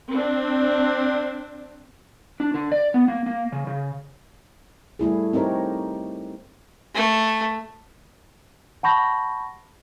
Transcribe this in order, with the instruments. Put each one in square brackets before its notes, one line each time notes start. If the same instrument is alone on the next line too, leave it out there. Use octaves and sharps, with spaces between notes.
[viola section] C4 D4
[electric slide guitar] D4
D3
D5
B3
A#3
A#3
C#3
C#3
[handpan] G3 A3 E4 G#4
C4 D#4 G4 A#4 C#5
[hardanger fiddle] A3
[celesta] F#5 A5 B5 C#6 G6 A#6